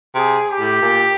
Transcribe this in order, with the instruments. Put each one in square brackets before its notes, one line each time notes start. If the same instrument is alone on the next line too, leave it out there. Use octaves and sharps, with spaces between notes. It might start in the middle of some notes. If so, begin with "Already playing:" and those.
[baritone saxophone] C3 [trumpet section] G#4
[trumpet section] G4
[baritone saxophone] A2
A#2